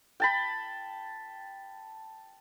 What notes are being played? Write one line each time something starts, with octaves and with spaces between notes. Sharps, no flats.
G5 A5 B5